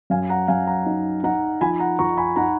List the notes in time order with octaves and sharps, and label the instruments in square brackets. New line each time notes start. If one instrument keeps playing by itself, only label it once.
[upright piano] F#2 [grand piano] F5 G#5
[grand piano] F#5 A#5
[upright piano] F#2 [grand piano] F5 G#5
[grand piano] F#5 A#5
[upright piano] D#4
[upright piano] D#4 [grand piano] F#5 A#5
[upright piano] F3 [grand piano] G#5 B5
[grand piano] F#5 A#5
[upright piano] F3 [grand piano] A#5 C#6
[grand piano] G#5 B5
[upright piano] D#4 [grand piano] F#5 A#5